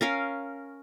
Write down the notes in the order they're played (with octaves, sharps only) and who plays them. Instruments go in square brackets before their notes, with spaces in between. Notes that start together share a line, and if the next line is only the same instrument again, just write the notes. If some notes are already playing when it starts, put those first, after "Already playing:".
[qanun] C#4 A#4 F5